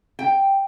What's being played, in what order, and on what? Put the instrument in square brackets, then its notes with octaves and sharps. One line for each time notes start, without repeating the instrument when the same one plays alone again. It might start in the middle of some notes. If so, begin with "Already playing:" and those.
[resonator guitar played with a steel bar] G5